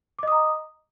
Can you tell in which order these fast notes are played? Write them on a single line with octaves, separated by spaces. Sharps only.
D6 D#5 D#6 A#5